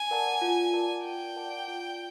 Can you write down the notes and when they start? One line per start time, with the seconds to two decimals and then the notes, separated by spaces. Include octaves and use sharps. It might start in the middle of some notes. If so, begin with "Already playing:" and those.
Already playing: G#5
0.11 A#4 D5 F#5 A5
0.41 F4
0.73 A#4 D5 F#5 A5
1.05 F4 G5
1.36 A#4 D5 F#5 A5
1.68 F4